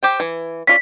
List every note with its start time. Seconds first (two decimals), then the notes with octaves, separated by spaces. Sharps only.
0.03 G4 C5 G5
0.20 E3
0.67 C#4 F4 D5 B6